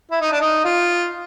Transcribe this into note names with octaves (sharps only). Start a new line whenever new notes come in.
E4
D#4
D4
D#4
F4